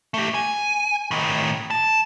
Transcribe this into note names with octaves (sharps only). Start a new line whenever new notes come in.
A3 G4
G#5
A2 D#3
A5